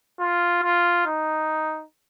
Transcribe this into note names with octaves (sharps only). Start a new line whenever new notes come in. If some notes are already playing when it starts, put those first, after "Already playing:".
F4
F4
D#4